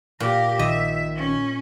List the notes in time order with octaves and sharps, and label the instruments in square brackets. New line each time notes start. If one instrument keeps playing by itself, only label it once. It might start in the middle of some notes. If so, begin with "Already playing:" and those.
[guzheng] A#2 [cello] G4 A#4
[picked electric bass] A#1 D#3 [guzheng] D#5 [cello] E5
[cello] C#4